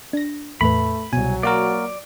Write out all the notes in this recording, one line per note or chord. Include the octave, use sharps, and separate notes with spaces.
D4 A#6
E2 A2 A3 B4 B5
C2 B2 F#3 G#5
A#3 F#4 A#4 D5